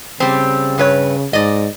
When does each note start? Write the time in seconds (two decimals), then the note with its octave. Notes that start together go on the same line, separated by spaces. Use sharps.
0.20 C#3 G3 C4
0.78 G2 B4 C#5
1.33 G#2 D5 D#5